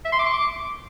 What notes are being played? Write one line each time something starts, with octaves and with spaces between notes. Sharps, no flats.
E5
C6
D6
C#6
D6